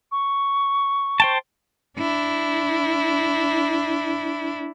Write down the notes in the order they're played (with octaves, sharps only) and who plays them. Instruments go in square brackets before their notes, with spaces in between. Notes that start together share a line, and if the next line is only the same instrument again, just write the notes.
[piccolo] C#6
[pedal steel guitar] C5 G5 A5
[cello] D4 E4